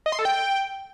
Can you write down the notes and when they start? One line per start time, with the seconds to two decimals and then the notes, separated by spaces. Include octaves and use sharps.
0.06 D#5
0.12 C6
0.19 A4
0.25 G5